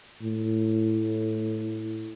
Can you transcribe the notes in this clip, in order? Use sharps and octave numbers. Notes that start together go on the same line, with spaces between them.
A2